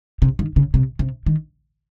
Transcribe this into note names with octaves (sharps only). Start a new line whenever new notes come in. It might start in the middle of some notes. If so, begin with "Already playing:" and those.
C3
D#3
C#3
C3
C3
D#3